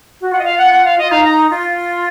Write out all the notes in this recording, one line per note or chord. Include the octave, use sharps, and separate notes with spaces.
F#4
F4 F#5
D#5
F5
F#5
F#5
F5
F4 D#5
D#4 F5
A#5
F4